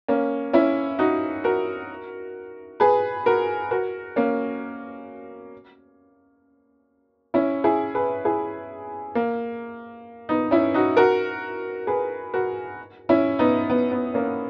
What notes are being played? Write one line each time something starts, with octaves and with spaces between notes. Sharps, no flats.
A#3 C#4
C#4 E4
D#4 F#4
F#4 A#4
G#4 B4
F#4 A#4
F#4 A#4
A#3 C#4
C#4 E4
E4 G#4
G#4 B4
E4 G#4
A#3
B3 D#4
C#4 E4
D#4 F#4
F#4 A#4
G#4 B4
F#4 A#4
C#4 E4
B3 D#4
B3
B3
A#3 C#4